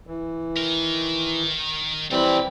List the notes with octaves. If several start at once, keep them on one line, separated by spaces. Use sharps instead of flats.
E3
D#3 A#4
E3 F3 G3 C4 B5